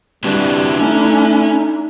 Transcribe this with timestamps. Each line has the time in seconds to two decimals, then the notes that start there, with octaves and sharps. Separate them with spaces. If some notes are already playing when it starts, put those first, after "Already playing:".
0.24 G3 C4 D4 E4 F#4 B4
0.80 A3 C#4 D#4